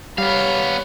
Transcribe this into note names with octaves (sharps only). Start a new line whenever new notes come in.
G3 B3 C#5 F5 B5